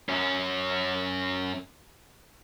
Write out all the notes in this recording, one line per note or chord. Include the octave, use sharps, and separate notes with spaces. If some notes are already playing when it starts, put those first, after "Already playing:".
F#2 C#4